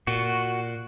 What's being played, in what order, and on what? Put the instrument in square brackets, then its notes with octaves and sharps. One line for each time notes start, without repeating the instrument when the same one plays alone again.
[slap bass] A#2 [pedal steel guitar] F#4